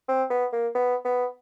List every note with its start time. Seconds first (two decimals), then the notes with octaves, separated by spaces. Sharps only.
0.08 C4
0.30 B3
0.52 A#3
0.75 B3
1.05 B3